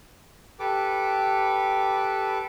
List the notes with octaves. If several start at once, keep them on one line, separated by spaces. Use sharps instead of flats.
G4 A4 B4 D6